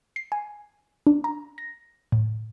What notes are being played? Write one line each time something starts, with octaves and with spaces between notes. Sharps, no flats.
C7
G#5
D4
A#5
A#6
A2